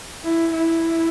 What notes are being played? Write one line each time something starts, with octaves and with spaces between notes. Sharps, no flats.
E4
E4